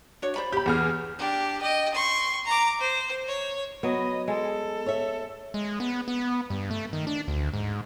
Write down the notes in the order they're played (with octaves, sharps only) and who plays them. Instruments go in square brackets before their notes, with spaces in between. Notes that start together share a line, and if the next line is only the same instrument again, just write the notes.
[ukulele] D4 F#4 C#5
C5 D5 B5
[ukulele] G4 [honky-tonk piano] B5 G6
[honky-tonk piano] E2 G#4 F6
[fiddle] D4 G4
D#5 G5
C6 C#6
A#5 D6
C5
C#5
[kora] F#3 [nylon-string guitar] B3 [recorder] D#5
[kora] G#3 [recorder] A4
[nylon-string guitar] C#5 E5
[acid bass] G#3
B3
B3
G2
A3
D#3
D4
D2
G#2